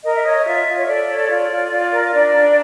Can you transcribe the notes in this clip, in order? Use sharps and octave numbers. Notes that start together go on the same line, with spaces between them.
A#4 D#5
E5
C#5 D#5
F4 E5
F4
C#5
A4 D5
C#5
F4 D5
F4
F4
A#4
D4 D5
D4